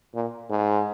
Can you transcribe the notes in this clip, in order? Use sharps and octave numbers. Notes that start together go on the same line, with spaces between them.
A#2
G#2